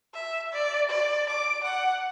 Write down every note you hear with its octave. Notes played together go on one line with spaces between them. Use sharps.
E5
D5
D5
D6
F#5